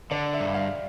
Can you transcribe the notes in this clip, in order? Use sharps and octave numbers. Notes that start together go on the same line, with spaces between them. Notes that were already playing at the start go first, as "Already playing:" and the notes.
D3 D5
E5
G2
F5